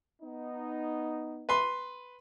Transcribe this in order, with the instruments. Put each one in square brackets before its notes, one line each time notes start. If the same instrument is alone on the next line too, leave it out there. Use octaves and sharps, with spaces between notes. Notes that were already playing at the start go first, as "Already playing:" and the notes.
[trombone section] B3 D#4
[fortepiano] B4 C6